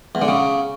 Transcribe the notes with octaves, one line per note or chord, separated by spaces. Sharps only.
E2
D3
C#3